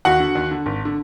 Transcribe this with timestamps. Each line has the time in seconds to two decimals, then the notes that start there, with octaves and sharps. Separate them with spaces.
0.05 D#2 F#4 F#5
0.20 D3
0.35 D#2
0.51 D3
0.66 G#1
0.85 D3